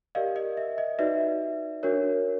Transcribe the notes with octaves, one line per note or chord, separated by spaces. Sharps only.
G4 A#4 D5 D#5 F5
D#5
E5
D#5
D#4 F#4 B4 D5 E5
D4 F#4 A#4 C#5